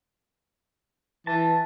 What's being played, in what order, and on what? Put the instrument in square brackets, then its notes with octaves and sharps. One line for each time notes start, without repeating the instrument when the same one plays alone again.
[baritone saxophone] E3 [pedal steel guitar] A5